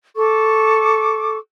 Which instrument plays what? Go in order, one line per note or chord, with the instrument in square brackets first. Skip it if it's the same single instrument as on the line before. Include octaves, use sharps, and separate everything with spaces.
[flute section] A4 C#6 D6